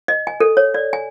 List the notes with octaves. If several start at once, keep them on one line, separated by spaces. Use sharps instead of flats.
D#5
G#5
A4
C#5
D5
G#5